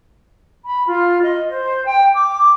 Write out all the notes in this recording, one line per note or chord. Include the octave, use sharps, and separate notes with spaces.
B5
F4
D#5
C5
G5
D6